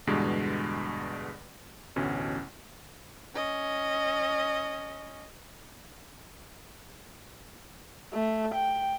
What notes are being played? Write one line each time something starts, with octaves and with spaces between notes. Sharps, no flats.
E2 G2 B2 D3 G#3
A1 D2 B2 C#4
C#4 D#5
A3
G5